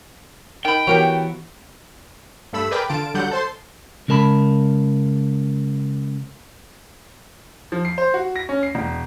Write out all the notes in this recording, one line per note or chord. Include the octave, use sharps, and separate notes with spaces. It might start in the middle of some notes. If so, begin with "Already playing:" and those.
D#3 G5 B5
E3 B3 F#4 G4 A#4 C#5
G2 A3 B5 E6
G#4 A#4 B4 D5 G5 B5
D3 F4 A5 D7
D3 F#3 G3 F#5 G6
A4 C5 C6
C#3 G#3 A#4 A5 B5
F3
C7
C5
F#4
A#6
C#4
C7
E1